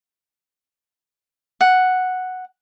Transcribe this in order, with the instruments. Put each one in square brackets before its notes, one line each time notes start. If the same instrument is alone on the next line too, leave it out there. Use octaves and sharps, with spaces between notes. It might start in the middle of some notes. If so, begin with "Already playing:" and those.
[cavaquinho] F#5